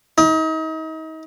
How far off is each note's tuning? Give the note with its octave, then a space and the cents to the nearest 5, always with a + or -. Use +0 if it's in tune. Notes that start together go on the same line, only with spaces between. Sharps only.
D#4 +35